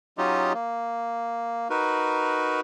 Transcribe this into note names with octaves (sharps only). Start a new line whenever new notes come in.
F#3 C#4 D#4 F4 G4 D#5
A#3
D#4 F#4 A#4 B4